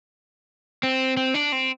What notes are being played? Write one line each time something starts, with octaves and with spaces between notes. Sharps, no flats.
C4
C4
D4
C4